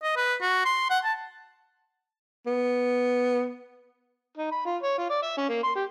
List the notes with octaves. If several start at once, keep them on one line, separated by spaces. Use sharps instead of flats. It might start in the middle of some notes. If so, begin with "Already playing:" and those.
D#5
B4
F#4
C6
F#5
A5
B3
D#4
B5
F4
C#5
F4
D5
E5
C#4
A#3
C6
G4